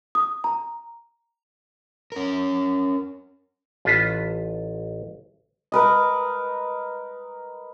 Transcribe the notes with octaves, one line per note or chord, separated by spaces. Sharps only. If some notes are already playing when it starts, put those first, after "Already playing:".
D#6
A#5
C#4 A#4
A1 F4 B4 E5
A#4 B4 D#5